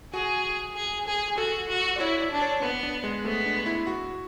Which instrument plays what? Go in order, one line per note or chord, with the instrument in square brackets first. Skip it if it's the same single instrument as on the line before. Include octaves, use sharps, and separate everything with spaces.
[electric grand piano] F#4 [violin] G#4
[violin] G#4
G#4
[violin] F#4 [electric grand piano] A4
[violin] F#4
[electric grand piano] D5
[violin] E4 [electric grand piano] C#5
[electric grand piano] D5
[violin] D4
[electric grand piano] C#5
[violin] B3 [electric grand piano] B4
[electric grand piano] D4
G#3
[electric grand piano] A3 [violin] B3
[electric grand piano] D4
E4
F#4